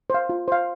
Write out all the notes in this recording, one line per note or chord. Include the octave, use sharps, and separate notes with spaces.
C5 F5
F4
C5 F5